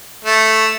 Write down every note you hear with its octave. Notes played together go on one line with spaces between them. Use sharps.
A3